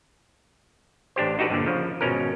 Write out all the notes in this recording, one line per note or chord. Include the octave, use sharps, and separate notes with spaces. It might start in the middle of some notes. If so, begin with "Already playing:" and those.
A1 D4 G4 C5
D#4 F#4 G4 A4 B4
G2 A#2 D3
C#3 F3
G#1 B2 C#4 A#4